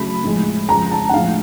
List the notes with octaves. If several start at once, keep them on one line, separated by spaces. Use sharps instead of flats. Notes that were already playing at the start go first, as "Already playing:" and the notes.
Already playing: C#3 F#3 A3 B5
A2 F3 G#3
C#3 F3 G#3 A#5
A5
F#5
A2 F3 G#3 F5